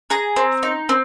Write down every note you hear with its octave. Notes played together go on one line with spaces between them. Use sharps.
G#4 A#5
C4
D#4
C4